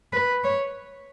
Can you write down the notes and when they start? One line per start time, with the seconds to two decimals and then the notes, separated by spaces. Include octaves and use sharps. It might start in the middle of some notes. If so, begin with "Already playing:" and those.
0.13 B4
0.44 C#5